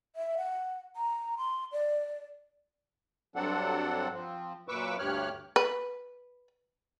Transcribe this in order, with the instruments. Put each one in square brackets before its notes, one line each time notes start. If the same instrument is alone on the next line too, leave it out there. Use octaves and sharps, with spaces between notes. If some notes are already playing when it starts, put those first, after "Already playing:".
[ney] E5
F#5
A#5
C6
D5
[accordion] G2 F#3 C4 D4 A4 F#5
F3 C4
F#2 A#2 B4 C#6 D6 E6
D2 G2 G4 C#5 F6 F#6
[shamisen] B4